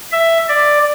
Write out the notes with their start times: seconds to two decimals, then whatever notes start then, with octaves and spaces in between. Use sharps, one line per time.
0.12 E5
0.48 D5